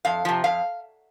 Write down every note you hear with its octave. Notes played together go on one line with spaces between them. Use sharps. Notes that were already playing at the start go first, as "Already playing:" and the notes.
F2 F5
C3 F3
F2 F5